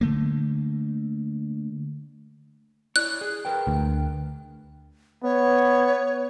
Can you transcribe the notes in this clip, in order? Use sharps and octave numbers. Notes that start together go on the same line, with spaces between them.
D3 A3 A#3
E4 C#5 D5 F#6
G#4
A#4 B4 G5
D2
B3 C#5